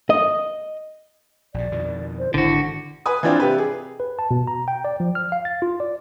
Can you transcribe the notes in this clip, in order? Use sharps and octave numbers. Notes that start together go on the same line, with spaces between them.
D#5
A#1 B2 D5
F2 B2 D#3
C5
G#1 D3 E4 F#4
B4 G#5 D#6
E3 F3 C4 D4 F4
C3 G4 B4
G#4
B4
A5
B2
A#5
G5
D5
F3
F6
F5
A6
F4
D5